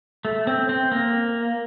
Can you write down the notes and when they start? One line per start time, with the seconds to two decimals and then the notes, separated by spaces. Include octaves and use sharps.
0.25 A3
0.47 C4
0.69 C4
0.92 A#3